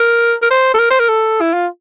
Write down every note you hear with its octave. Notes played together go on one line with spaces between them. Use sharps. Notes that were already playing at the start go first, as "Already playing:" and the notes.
Already playing: A#4
A#4
C5
A4
A#4
C5
A#4
A4
E4
F4